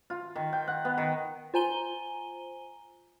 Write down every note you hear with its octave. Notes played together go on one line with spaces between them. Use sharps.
F4
D#3
G5
F#5
B3
D#3
F4 C5 G#5 A#5 D#7 G7